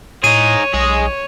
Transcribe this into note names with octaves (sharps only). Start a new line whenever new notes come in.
A2 D#4 G#4 C#5 D#7
B1 G#4 D#5